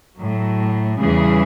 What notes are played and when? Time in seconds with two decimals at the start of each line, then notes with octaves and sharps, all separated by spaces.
0.17 A2 F#3
0.98 E2 C#3 E3 G3 G#4